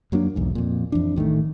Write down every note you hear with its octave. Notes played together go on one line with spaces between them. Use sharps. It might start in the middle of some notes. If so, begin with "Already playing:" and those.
F#2 F#3 A#3 D4
B1 E2 G#2
F2 A#2
F2 E3 D4
A1 D#3 G#3 A3